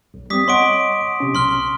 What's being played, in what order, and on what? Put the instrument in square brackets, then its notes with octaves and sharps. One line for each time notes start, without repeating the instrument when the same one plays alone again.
[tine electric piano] B1
[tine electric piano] G3 B3 C4 [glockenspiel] D6 D#6 B6
[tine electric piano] C#5 D#5 F#5 [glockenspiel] C6 C#6 D7
[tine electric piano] C3 C#4
[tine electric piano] B1 [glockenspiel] C6 F6 G7